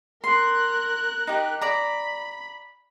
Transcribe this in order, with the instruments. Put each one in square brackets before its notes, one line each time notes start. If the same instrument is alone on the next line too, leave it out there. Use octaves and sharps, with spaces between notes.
[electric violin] A#4 F#6 [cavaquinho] C6
[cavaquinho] D#4 G4
[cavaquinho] D5 A#5 [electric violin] B5